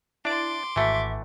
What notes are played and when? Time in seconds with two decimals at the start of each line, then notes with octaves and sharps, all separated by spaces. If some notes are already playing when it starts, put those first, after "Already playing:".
0.25 D4 E4 D5 C6 D6
0.76 G#1 E3 A3 F#4 E5